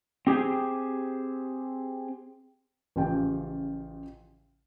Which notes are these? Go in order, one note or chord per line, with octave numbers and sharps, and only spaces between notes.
C4 G4 G#4 C5
A1 C#3 F3 F4 G4 G5